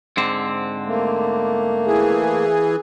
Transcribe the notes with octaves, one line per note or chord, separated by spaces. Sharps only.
G#2 D3 C4
A3 A#3
E3 G#4